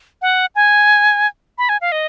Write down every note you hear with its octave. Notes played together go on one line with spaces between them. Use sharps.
F#5
G#5
B5
G#5
F5
D#5